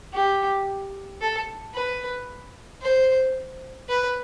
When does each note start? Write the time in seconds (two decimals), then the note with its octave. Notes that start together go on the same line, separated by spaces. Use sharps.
0.13 G4
1.21 A4
1.74 B4
2.82 C5
3.89 B4